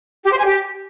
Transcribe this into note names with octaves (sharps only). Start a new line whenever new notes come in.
G4
C5
G#5
G4